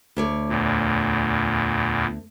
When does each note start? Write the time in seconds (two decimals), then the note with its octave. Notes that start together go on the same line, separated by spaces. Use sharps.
0.17 D2 C#5 D5
0.49 E2 A#2